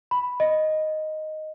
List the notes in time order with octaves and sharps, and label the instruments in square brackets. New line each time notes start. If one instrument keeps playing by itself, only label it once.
[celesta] B5
D#5